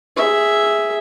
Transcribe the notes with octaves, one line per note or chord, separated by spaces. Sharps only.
G#4 E5